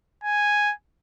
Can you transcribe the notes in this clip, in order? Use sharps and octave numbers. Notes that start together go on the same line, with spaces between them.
G#5